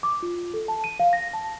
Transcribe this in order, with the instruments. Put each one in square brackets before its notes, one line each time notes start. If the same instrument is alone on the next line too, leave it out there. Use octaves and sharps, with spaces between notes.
[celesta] D6
F4
A4
A5
D#7
F5
A#6
A5